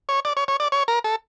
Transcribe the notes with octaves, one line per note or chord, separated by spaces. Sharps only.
C#5
D5
C#5
C#5
D5
C#5
A#4
A4